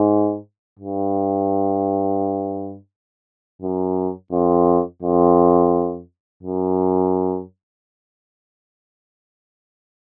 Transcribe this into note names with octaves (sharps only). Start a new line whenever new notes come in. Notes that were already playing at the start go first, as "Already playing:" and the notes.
Already playing: G#2
G2
F#2
F2
F2
F#2